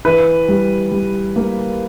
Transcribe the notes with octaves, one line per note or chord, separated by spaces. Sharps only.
E3 B4
G3
G3
A#3